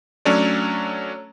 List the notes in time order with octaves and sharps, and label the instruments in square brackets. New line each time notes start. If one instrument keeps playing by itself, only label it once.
[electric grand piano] F#3 A3 C#4 D4 C#5 D5